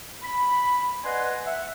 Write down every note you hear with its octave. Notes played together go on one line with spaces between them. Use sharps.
B5
B4 D5 D#5 F#5 G#5 C6
E5 F#5